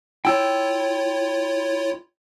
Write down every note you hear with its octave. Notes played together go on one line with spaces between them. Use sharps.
E4 F4 C#5 G5 E6